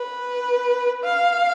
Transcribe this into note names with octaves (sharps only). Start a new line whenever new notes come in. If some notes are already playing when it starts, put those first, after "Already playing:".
Already playing: B4
F5